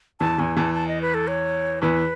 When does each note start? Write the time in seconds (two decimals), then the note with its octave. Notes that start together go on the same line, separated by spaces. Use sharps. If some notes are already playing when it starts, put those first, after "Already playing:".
0.20 E2 E3 A5
0.38 E2 E3 G#5
0.57 E2 E3 A5
0.74 A5
0.88 D#5
1.02 B4
1.14 A4
1.28 C#5
1.82 E2 E3 B4